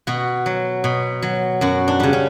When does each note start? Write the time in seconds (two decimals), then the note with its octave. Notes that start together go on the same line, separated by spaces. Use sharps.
0.07 B2 F#4
0.46 F#3
0.84 B2
1.22 F#3
1.61 F#2 F#4
1.88 D4
2.00 C#3 G3
2.13 C#4